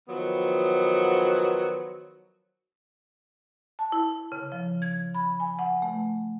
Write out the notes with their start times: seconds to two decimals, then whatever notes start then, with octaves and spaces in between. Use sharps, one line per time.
0.07 D#3 F3 F#3 B3
3.79 A5
3.92 E4
4.32 C#3
4.52 F3
4.82 G#6
5.15 B5
5.40 G#5
5.59 F#5
5.82 A3